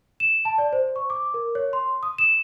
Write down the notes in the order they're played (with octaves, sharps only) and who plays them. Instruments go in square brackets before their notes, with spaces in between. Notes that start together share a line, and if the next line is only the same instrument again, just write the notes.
[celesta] E7
A5
D5
C5
C#6
D6
A#4
C#5
C6
D#6
E7